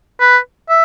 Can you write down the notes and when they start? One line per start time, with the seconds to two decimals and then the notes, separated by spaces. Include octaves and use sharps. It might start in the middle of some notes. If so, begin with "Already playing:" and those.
0.20 B4
0.69 E5